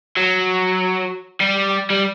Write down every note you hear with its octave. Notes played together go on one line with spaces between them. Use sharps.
F#3
G3
G3